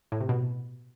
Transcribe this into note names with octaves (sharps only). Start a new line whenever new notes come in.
A2
C3
B2